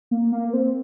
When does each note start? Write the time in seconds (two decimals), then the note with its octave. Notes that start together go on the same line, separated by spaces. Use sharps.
0.11 A#3
0.32 A#3
0.49 A#3
0.53 C4